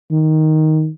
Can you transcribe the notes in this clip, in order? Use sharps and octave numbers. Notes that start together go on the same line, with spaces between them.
D#3